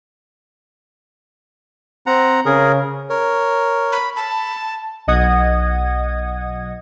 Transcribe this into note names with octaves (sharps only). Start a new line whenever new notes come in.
C4 F#5 A#5
C#3 G#4 A#4
A#4 C#5
B5
A5 B5
B1 D#5 F#5 D#6 G#6